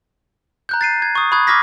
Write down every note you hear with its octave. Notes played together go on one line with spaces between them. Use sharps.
A#5 F#6 G6
A6 C7 D#7
G#6
C#6 D#6
B5 C#6 D#6 F#6 G#6
C#6 D6 F6 G#6 A#6 B6